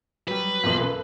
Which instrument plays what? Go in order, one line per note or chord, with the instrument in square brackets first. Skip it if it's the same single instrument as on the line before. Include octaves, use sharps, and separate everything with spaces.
[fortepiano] F#3 G3 [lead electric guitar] B4
[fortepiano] B1 E2 A#2
F#2 A4 B4